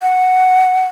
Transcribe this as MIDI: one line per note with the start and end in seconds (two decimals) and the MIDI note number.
0.02 0.86 78